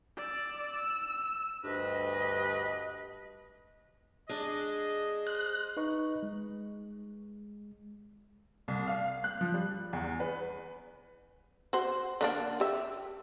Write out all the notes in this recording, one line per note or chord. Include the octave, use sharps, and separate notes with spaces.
D5 E6
E6
D2 G2 B4 D#5
G#3 D4 D#5
C5 F#6
D#4 B4 D#5 C#6
G#3
C2
F5
F#6
F3
G3
E2
B4
F#4 C5
D3 A#3 D4
G4 E5